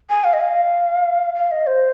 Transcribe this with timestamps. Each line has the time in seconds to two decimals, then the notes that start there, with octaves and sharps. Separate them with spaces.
0.09 G#5
0.24 F5
0.33 D#5
0.40 F5
1.35 F5
1.51 D#5
1.67 C5